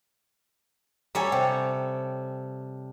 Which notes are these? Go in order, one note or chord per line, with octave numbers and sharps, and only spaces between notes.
G3 A4 C#5 G#5 A#5
C3 G5